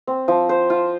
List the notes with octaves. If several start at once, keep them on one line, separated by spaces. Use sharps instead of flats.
C4
F3
C5
F4